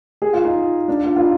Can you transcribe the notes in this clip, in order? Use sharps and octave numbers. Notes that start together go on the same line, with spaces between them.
G#4
F4
D#4
D4
F4
F4
D#4